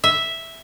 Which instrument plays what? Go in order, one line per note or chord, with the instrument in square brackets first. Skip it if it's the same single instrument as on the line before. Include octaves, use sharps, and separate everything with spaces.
[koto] E5